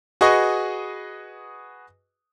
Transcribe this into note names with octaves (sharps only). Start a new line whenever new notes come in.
F#4 G#4 B4 D#5 C#6